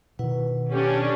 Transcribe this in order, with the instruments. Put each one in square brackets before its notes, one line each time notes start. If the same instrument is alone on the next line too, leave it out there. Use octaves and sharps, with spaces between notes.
[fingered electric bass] B2 D#3 [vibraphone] E4 B4 F#5
[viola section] C#4 D4 [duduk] G4 [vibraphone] A4